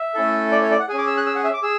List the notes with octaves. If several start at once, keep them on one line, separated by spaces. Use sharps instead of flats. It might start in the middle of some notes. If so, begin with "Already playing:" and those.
Already playing: E5
A3 C#4 E4 A4
D5
C#5
D5
F#5
C#4 G#4 G#5 D6
E6
F#6
E6
F#5
E5
D6
G#4 E6